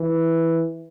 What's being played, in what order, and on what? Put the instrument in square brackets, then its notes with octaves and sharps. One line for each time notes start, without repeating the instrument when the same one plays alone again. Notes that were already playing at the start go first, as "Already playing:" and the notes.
Already playing: [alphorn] E3